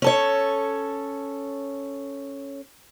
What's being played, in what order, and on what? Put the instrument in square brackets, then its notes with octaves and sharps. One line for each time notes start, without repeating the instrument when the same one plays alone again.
[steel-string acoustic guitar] C#4 A4 C#5